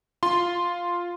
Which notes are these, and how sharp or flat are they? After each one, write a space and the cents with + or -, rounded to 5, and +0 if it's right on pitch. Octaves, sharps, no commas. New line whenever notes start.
F4 +0 C6 +0